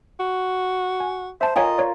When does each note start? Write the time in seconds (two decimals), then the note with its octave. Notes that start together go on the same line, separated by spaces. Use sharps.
0.20 F#4
1.00 G#5
1.41 C5 E5 A5
1.56 F4 A#4 C#5 D#5 G5 G#5
1.78 C#5 D5